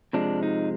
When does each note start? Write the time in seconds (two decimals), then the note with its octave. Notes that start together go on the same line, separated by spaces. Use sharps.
0.13 C3 F3 G#3 D4
0.43 D#4